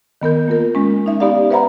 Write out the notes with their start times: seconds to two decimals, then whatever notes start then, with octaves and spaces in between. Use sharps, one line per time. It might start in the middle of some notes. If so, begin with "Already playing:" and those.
0.22 D#3 B3 A#4 G6
0.48 A#3 F4 A#4
0.75 G#3 C#4
1.06 D#4 E5
1.20 B3 D#4 G4 D5 F5
1.51 B4 C5 E5 F#5 A#5 B5